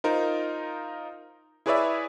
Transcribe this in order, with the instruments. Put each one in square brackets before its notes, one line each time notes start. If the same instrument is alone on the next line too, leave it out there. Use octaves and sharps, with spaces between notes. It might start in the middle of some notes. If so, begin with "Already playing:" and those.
[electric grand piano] D#4 F4 A#4 C5
E4 G#4 B4 C#5 D5 E5